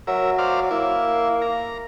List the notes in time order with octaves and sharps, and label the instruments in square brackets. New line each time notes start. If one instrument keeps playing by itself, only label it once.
[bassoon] F#3 [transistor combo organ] A#4 E5
[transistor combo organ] C5 D5 F5
[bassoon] A#3 [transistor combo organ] E4
[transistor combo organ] A#5